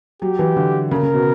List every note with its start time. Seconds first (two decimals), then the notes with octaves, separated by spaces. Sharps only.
0.22 F#3 G4
0.39 E3
0.56 D3
0.91 C#3 A#4
1.03 C#3
1.14 B2